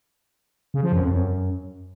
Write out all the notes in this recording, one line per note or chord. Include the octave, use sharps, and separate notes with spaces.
C#3
F3
F#2
F2
F#2